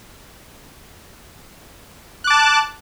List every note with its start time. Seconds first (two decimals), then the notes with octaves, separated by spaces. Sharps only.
2.24 F#6
2.27 D6
2.30 A5